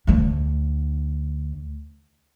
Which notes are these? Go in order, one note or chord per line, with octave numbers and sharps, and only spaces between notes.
D2 D3